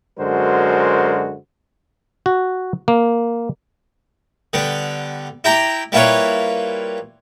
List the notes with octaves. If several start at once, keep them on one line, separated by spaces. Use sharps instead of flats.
F#2 D3 G#3 F#4 A#4 C5
F#4
A#3
D3 G3 B3
E4 G4 G5 A#5
G3 A#3 E4 F4 B4 C#5